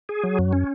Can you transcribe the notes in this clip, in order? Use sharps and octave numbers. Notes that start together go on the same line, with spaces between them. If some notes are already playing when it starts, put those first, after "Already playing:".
G#4
F#3
F#2
C#4